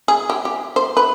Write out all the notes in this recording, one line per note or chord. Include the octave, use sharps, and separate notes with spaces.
G#4
G4
G4
C5
B4